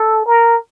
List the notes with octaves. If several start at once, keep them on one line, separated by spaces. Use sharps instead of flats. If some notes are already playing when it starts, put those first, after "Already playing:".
Already playing: A4
A#4